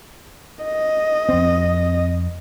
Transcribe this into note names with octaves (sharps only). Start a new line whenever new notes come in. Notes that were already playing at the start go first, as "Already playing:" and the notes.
D#5
F2 C4